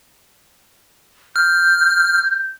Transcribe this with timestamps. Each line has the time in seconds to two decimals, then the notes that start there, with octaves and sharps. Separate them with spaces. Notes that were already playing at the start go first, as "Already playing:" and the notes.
1.36 F6 G6